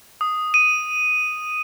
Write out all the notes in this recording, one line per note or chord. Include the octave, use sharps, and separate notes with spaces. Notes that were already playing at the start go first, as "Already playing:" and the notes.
D#6
D#7